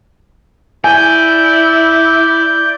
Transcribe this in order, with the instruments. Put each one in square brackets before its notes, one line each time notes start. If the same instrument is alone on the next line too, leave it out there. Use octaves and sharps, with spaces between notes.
[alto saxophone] E4 [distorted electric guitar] D5 [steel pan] G#5 [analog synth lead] G6